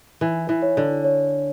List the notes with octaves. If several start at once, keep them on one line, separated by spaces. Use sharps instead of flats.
E3 G#5
E3
C#5
D3
C#5